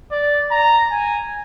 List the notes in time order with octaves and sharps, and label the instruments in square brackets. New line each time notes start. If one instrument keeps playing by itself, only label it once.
[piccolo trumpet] D5
A#5
G#5